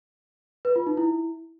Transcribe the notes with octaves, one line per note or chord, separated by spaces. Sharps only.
B4
F4
D#4
E4